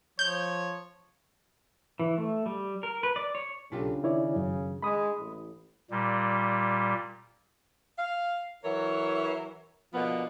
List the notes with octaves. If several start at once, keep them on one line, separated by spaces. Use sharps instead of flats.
F3 C#5 G6
E3
A3
G3
A#4
B4
D5
C#5
B1 C#3 C#4 D4 F4 G4 A4
D#3 E4 C#5 D5
F#2
G#3 B5 D#6
A1
A#2 G3
F5
E3 F#3 A#4 C#5
B2 D3 F3 A#3 B3